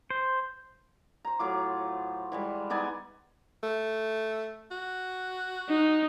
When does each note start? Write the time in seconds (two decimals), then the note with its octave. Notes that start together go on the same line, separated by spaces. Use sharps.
0.10 C5
1.25 C5 A#5
1.39 A2 F#3 F4 D6
2.32 E3 G3 G#3
2.70 B3 D#4 D5 G#5
3.63 A3
4.71 F#4
5.69 D#4